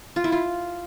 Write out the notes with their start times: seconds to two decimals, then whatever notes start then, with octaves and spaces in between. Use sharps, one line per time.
0.16 F4
0.24 E4
0.32 F4